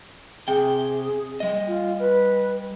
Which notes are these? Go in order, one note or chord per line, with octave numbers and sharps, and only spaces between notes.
C3 G#4 G5
G3 D#5
F4
B4